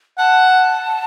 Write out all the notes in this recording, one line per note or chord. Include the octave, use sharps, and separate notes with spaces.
F#5 A5